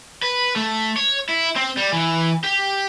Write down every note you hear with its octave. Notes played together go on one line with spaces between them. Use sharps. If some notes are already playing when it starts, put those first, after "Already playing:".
B4
A3
C#5
E4
C4
G3
E3
G4